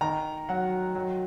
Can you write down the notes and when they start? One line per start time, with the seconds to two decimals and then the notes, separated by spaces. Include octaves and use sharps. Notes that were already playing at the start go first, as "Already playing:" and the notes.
0.01 D#3 A#5
0.49 F#3 F#5
0.95 F#3